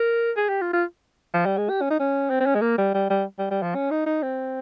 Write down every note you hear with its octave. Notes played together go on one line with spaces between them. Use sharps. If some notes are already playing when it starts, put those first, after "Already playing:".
Already playing: A#4
G#4
G4
F4
F4
F3
G3
G#3
G4
C#4
D#4
C#4
C4
C4
C#4
G#3
A#3
G3
G3
G3
G3
G3
F3
C#4
D#4
D#4
C4